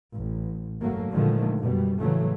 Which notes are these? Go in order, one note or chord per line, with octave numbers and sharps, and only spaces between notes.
A1
F#1 G#2 F#3 A3 A#3
A#2 D3 D#3 F3 G#3 A3
F#2 B2 G3
A2 C#3 E3 F#3 G3 A3